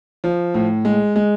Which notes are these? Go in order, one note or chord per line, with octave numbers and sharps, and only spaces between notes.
F3
A2
G#3
G#3